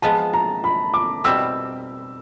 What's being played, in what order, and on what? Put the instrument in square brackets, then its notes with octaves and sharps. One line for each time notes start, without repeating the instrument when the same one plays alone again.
[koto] F3 G#3 B3 [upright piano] A5
[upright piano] A#5
B5
D6
[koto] B2 G3 C4 E4 [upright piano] E6